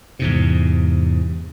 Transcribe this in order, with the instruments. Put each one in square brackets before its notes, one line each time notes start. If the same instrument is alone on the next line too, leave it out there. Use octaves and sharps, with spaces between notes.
[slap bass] E2 G#2 C3